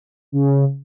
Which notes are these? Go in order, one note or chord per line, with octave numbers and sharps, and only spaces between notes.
C#3